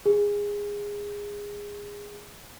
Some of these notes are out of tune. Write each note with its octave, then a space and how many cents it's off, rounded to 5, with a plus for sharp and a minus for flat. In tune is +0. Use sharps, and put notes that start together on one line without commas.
G#4 -20